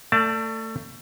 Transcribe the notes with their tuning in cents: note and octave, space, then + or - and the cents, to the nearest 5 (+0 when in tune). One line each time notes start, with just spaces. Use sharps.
A3 +25 D5 +0 A5 +0